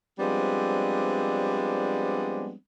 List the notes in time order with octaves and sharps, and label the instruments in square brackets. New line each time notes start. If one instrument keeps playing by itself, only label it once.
[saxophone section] F3 G3 G#3 B3 C4 D4